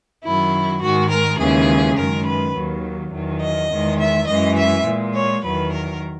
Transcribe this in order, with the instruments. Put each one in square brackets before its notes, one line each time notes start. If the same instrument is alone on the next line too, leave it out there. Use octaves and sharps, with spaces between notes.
[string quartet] F#2 D#3 F#3 E4
G#2 D#3 G#3 F#4
A#4
D#2 C#3 E3 G#3 G#4
F#2 D#3 G#3 A#4
B4
D#2 D#3 F#3
E2 D#3 F#3
D#5
E2 D#3 G#3
E5
F#2 E3 G#3 D#5
E5
A#2 G#3
C#5
E2 D#3 F#3 B4
A#4